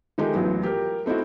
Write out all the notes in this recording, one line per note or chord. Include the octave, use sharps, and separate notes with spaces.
D#3 F3 G#3 A3 D#4 G4
A1 F3 F#3 B3
G4 A#4
A3 C4 D#4 E4 F#4